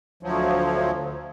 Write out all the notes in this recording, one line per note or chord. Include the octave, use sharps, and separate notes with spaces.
D2 F3 F#3